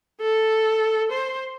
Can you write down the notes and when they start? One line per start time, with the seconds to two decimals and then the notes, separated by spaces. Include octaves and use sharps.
0.21 A4
1.11 C5